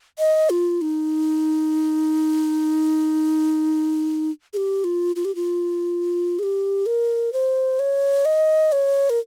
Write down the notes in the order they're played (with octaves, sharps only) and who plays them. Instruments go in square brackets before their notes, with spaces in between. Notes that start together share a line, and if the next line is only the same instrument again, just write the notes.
[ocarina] D#5
F4
D#4
G#4
G4
F4
F4
G4
F4
G#4
G4
A#4
C5
C#5
D#5
C#5
A#4